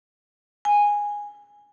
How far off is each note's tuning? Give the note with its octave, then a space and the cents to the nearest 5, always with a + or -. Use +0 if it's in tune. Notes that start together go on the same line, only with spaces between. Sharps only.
G#5 -10